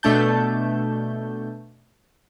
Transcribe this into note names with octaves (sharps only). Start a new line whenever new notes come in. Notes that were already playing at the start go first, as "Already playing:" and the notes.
B2 A3 D4 A5 G6